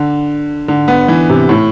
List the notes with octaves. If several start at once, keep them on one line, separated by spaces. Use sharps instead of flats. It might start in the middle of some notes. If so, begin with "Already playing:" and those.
Already playing: D3
D3
B3
E3
C3
A2